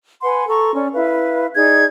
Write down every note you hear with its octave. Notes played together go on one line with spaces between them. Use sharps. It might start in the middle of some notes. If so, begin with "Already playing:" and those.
B4 F#5 G#5 C6
A4 A#5 C#6
C#4 D5
E4 B4 F5
D#4 G#4 D5 G#6